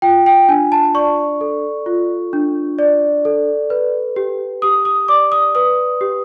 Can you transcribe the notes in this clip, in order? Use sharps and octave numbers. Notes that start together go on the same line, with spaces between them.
F4 G5
G5
D4 G#5
A5
D5 C#6
A4
F4
D4
D5
A4
B4
G4
G4 D#6
D#6
D5 D6
D#6
B4 D#6
G4